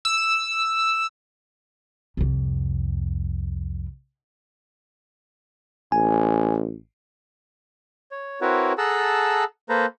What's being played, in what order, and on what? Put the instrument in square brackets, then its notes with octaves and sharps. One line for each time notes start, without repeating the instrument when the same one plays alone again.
[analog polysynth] E6
[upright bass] C2 F2
[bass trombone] A1 [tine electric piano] G#5
[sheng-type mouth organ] C#5
C4 E4 F#4 A#4 B4 C#5
G#4 A4 F#5 A5 A#5 E6
A#3 A4 B4 C5 A#5